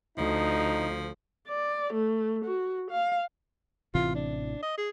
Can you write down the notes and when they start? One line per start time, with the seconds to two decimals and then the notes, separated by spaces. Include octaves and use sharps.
0.18 D2 F3 D#4
1.48 D5
1.94 A3
2.45 F#4
2.91 F5
3.95 A1 C3 E3 F4
4.15 D4
4.62 D#5
4.78 G#4